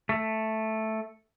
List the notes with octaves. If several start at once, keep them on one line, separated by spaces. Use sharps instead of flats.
A3